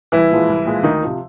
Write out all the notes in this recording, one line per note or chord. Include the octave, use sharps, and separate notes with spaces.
C2 E3 E4
A#2 F3 G#3
C2
A#2 F3 G#3
D2 D#3 D#4
C3 F3